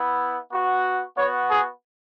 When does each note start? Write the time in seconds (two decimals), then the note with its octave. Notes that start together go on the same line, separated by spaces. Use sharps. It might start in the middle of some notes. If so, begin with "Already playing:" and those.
Already playing: B3 E4
0.50 B3 F#4
1.15 B3 F#4 C#5
1.48 G#4